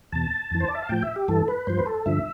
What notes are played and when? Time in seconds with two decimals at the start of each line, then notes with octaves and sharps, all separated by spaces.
0.12 E2 B2 A5
0.51 F2 E3
0.60 C5
0.68 D5
0.75 E5
0.83 F5
0.89 A2 F3 G5
1.02 E5
1.16 G4
1.28 G2 E3 A4
1.48 B4
1.67 G2 F3 C5
1.78 B4
1.86 A4
2.06 G2 D3 F3 E5